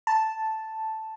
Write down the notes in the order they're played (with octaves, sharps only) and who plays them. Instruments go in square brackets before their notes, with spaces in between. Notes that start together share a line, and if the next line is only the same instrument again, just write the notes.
[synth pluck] A5